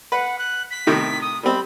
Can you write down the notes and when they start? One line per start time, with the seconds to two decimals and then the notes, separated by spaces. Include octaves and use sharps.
0.12 B4 F#5
0.38 F#6
0.70 B6
0.87 A2 C3 D#3
1.21 D#6
1.43 G3 C4 B5